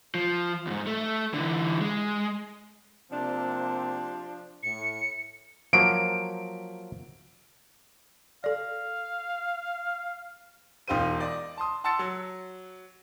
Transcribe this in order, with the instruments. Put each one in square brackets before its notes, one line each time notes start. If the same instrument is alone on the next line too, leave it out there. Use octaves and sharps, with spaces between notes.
[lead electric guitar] F3
D#2 G#2
A3
D3 E3
G#3
[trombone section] C3 A#3 C4 [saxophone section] F3 D4
[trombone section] A2 [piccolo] C#7
[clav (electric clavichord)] F3 F#3 A#3 [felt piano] D7
[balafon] A4 D5 [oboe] F5
[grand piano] E1 D#4 F4 G4 C5 D#7
D5 D#5
A5 C6 D#6
F#5 A5 C6 E6 A6 C#7
F#3